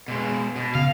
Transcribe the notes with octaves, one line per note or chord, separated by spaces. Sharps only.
B2 G#3
B2
C#3 F5